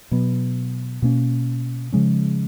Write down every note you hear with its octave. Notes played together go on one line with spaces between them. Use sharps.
B2 F#3 B3
B2 A#3 C#4
C#3 F3 G#3 C#4